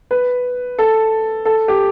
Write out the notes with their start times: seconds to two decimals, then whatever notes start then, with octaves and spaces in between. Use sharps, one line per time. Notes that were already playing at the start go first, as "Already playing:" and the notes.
0.11 B4
0.78 A4
1.45 A4
1.68 G4